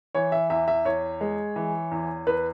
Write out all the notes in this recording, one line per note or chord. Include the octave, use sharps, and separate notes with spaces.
E3 C#5
E5
E2 E5
E5
E2 C#5
G#3
E3
E2
E2 B4